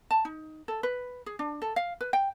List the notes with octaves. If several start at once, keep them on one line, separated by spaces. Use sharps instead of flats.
A5
D#4
A4
B4
G#4
D4
A4
F5
B4
G5